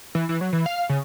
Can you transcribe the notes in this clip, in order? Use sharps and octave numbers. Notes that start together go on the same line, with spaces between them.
E3
E3
F#3
E3
F5
C#3